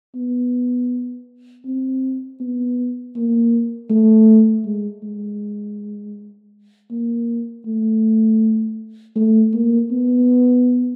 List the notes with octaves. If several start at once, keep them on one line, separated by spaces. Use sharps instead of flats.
B3
C4
B3
A#3
A3
G#3
G#3
A#3
A3
A3
A#3
B3